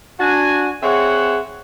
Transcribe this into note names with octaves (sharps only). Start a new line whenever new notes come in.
D4 F#4 G#5
C4 G#4 C#5 E5 F#5